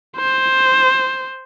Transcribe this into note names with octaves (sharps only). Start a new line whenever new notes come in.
C5